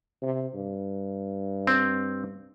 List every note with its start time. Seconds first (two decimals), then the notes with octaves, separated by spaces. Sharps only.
0.22 C3
0.55 G2
1.67 C4